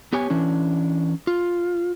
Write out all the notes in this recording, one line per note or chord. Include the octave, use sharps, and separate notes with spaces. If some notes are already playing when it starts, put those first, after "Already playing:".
B3 G4 C#5 G#5
E3 C#4 D4
F4